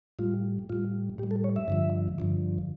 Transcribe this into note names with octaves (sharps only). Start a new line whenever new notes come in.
A2 G3 F4
A2 G3 F4
A2 G3 G4
A4
C#5
E5
G2 D3 F3
G2 D3 F3